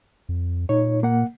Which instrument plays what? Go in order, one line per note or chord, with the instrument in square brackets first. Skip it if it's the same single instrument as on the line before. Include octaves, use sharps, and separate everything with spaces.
[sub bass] F2
[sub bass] A#2 [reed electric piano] D#4 C#5
[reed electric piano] A#3 F#5